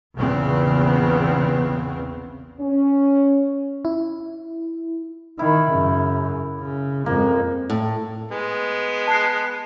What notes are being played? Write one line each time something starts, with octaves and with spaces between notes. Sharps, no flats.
A#1 E2 C#3 B3 C4
C#4
E4
D#3 E4
F#2 C#3
C#3
F2 G#3 A#3
A2
G#3 B3
A5 F#6 C7